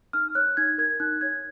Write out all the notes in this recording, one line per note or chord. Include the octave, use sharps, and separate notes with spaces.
D#4 F6
C#5 F#6
D#4 G#6
A#4 G#6
D#4 F#6
C#5 G#6